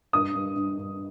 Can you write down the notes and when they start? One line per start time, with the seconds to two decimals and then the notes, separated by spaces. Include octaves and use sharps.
0.13 G2 D#6
0.35 G2
0.56 G2
0.78 G2